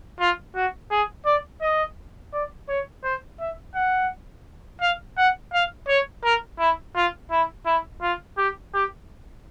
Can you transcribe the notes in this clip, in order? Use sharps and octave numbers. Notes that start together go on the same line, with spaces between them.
F4
F#4
G#4
D5
D#5
D5
C#5
C5
E5
F#5
F5
F#5
F5
C#5
A#4
E4
F4
E4
E4
F4
G4
G4